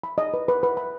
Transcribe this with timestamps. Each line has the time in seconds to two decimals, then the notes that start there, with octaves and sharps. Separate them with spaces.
0.04 B5
0.18 D#5
0.34 B4
0.48 B4
0.63 B4
0.77 B5